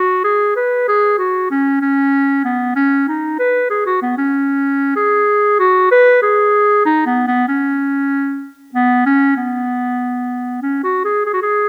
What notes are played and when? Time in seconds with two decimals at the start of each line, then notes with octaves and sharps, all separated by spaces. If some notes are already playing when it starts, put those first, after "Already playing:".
Already playing: F#4
0.24 G#4
0.56 B4
0.88 G#4
1.19 F#4
1.51 C#4
1.81 C#4
2.45 B3
2.76 C#4
3.08 D#4
3.39 B4
3.70 G#4
3.86 F#4
4.02 B3
4.18 C#4
4.96 G#4
5.60 F#4
5.91 B4
6.22 G#4
6.86 D#4
7.06 B3
7.28 B3
7.48 C#4
8.75 B3
9.06 C#4
9.37 B3
10.62 C#4
10.84 F#4
11.05 G#4
11.26 G#4
11.34 F#4
11.42 G#4